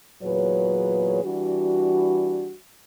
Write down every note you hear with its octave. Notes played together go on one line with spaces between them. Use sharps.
E2 A#2 F#3 G#4 B4 C#5
E3 G3 D4 F#4